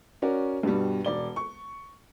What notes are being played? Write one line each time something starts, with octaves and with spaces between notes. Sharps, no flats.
C#4 F#4 A#4 D5
G2 B2 G3
E1 D5 G7
C#6